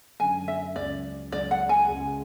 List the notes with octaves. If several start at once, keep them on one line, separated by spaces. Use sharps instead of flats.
F#2 D3 F#3 G#5
E5
C#2 C#3 F#3 C#4 D5
C#2 C#3 F#3 C#4 D5
F#5
G#5
C#2 C#3 G#3